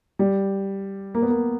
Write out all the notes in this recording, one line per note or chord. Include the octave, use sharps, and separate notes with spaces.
G3
A#3
B3
A#3